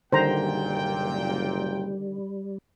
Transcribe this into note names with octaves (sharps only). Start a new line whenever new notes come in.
F#1 A#2 D3 D#3 G3 C5 G5 A#5